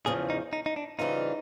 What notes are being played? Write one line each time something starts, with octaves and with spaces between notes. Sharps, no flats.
E2 C#3 F3 G#4
D#4
D#4
D#4
D4
C#3 E3 G3 C4 D#4 F4